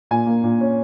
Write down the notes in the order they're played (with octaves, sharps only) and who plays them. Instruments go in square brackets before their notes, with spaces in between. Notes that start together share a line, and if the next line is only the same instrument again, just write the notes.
[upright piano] A#2 G#5
A#3
A#2
C#4